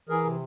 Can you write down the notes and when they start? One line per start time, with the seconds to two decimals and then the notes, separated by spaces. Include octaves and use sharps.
0.09 E3 G#4 A#4
0.24 C3